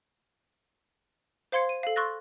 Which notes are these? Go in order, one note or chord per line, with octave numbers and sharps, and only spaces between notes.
C5 F5 C6 G#6 C#7
D#7
A4 F5
C6 C#6 E6 F#6 A6 A#6